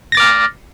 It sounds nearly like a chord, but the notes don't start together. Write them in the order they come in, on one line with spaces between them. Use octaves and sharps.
A#6 A6 D6 F6